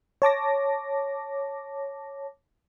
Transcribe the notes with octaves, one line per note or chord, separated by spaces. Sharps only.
C#5 A5 D6 A#6